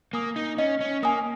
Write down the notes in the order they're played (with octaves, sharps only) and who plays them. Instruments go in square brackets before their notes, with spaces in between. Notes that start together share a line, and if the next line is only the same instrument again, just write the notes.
[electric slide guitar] A#3 [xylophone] G#5 D#6
[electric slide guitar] D#4
[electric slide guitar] C#4 [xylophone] D#5
[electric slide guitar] C#4
[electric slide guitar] A#3 [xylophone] G#5 D#6